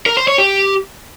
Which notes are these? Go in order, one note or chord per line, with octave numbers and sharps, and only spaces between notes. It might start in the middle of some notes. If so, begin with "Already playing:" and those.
A#4
C5
C#5
G4